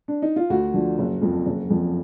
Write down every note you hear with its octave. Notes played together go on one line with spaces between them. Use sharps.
D4
D#4
F4
D2 F#4
D3 F3
F#1
F2 F3
F#1
F2 F3